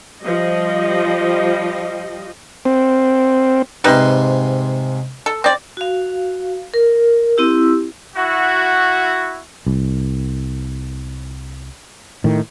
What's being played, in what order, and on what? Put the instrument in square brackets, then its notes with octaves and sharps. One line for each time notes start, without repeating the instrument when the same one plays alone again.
[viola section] F3 G3 D#5
[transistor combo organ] C4
[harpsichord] G#2 C3 C6 [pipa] G3 D#4 B4
[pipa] A4
C4 D5
[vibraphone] F#4 F5
A#4
C4 E4 G4 E6
[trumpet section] E4 F#4
[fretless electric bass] C2
A2 D#3